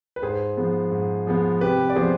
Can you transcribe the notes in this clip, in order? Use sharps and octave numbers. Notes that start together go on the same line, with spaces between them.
B4
G#2 G#4 C5
F3 G#3 B3
G#2
F3 G#3 B3
C3 G4 B4
D5
F3 G#3 B3 G#4 C5